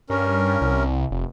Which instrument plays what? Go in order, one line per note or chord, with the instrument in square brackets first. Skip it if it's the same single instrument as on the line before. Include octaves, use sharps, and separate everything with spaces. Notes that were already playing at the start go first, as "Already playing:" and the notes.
[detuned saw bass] G2 [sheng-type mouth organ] C#4 A#4
[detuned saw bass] C2
F1